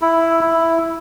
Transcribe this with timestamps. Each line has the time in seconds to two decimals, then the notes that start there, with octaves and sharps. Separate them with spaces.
0.02 E4
0.41 E4